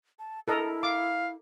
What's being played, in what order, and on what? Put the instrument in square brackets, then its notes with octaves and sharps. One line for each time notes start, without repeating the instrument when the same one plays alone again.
[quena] A5
[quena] E4 [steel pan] A4 A#4 D#5
[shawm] F5 [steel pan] D6